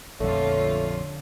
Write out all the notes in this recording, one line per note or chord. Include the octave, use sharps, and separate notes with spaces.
A#1 F2 D3 A3 F4 C#5